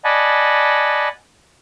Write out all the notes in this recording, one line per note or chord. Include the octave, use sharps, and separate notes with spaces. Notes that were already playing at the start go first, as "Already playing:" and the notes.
D5 D#5 F#5 G#5 A5 B5